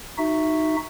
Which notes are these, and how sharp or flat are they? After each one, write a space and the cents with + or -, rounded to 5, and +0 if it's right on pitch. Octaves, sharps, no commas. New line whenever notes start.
D#4 -5 F#4 +0 E5 +0